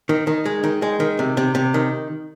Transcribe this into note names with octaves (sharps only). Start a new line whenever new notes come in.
D#3
D#3
G#3
D#3
G#3
D#3
C3
C3
C3
D#3